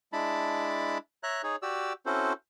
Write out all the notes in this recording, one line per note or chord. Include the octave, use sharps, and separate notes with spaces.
G#3 D4 E4 A5 B5
C#5 E5 A#5 F#6
D#4 G#4 C#5
F#4 G4 D5 E6
C4 C#4 E4 F#4 A4 C5